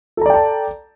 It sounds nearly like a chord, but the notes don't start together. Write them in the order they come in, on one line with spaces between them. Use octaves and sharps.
A4 A#5 D5 G5 A5